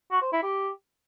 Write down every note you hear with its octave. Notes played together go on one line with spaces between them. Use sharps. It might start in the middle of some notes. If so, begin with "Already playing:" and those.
F#4
C5
E4
G4